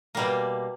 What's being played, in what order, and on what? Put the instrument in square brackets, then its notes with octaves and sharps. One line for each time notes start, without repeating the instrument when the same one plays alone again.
[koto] B2 G3 A#3